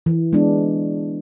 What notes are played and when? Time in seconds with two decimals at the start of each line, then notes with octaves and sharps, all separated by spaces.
0.06 E3
0.33 G#3 B3 D4